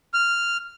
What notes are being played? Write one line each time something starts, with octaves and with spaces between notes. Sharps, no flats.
F6